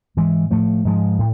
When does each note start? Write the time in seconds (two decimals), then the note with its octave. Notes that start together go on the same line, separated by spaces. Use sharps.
0.17 G#2 E3 G#3
0.51 A2 F3 A3
0.85 G#2 F3 G#3
1.19 A2